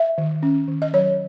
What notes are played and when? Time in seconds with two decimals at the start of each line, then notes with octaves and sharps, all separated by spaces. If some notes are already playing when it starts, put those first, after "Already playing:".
Already playing: E5
0.18 D#3
0.43 C#4
0.68 D#3
0.82 D#5
0.93 F#3 C#5